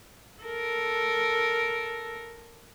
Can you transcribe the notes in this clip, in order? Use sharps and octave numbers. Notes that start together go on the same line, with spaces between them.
A4 A#4